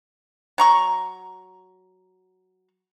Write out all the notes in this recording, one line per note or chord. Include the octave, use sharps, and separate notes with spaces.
F#3 A#5 C#6